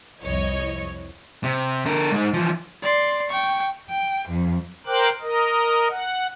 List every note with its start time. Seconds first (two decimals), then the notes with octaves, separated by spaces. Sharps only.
0.23 C2 F2 E4 C#5 D#5
1.44 C3
1.85 D3 A#4
2.12 G#2 D#4
2.34 E3 F3
2.83 D5 C6
3.29 G5 C#6
3.90 G5
4.29 F2
4.86 A#4 C5 G5 D6 F#6
5.21 A#4 D#5
5.90 F#5